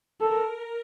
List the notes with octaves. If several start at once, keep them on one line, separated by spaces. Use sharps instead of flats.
A4 A#4